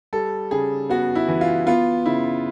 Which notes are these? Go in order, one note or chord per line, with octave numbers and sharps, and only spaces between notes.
G3 A4
C#3 G#4
B3 F#4
E4
E3
F4
B3 F4
C#3 E4